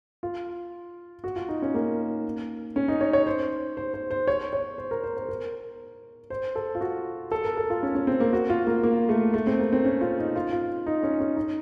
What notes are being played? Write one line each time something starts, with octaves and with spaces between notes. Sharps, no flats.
F4
F#4
F4
D#4
C#4
A#3
C#4
D#4
C#5
C#5
C5
C5
C5
C5
C#5
C#5
C5
A#4
C5
C5
A#4
C5
A4
F4
F#4
A4
A#4
A4
F4
C#4
C#4
C4
A#3
F#4
F4
A#3
A#3
A3
A3
C4
A#3
C4
C#4
F4
D#4
F4
F4
D#4
C#4
C#4
D#4